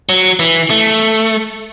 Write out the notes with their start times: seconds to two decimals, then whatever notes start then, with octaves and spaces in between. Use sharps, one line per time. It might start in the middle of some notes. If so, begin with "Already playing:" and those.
0.09 F#3
0.39 E3
0.70 A3